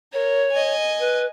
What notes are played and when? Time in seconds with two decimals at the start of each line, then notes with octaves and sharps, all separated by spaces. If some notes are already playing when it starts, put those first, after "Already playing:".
0.13 A#4 C#5
0.52 D#5 G#5
1.00 B4